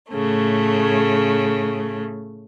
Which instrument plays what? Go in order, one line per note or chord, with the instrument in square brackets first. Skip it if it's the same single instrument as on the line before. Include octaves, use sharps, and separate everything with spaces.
[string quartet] A2 C#3 A3